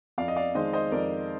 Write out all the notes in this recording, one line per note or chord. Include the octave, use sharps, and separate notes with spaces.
F2 D5 F5
D#5
D5 F5
D#3 G#3 C5 D#5
C5 D#5
F2 A#4 D5